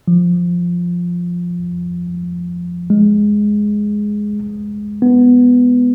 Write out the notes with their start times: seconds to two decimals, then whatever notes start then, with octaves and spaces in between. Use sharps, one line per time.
0.08 F3
2.90 G#3
5.02 B3